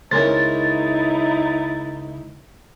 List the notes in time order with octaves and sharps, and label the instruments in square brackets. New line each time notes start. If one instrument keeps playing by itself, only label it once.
[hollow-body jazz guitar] C#2 [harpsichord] C#4 A#4 C5 [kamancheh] D#4 E4 [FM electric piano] A6